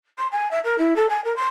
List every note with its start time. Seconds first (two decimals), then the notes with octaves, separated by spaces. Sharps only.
0.18 C6
0.31 G#5
0.51 E5
0.64 A#4
0.78 E4
0.96 A4
1.09 G#5
1.24 A#4
1.36 C6